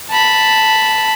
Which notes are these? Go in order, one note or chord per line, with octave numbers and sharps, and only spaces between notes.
A5 B5